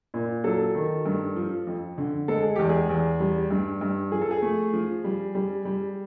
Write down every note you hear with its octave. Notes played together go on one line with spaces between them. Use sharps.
A#2
F#3 A4
D#3
G2
F3
F2
D3
G#3 A4
G#4
E2 G4
G#4
E2
G3
G2
G2
F3 G#4
A4
G#4
A3
F3
G3
G3
G3